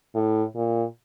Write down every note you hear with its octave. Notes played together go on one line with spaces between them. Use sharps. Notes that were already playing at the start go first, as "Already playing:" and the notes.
A2
A#2